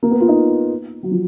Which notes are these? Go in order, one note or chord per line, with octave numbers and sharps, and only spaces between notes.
A#3
B3
F4
D#4
F#3
F3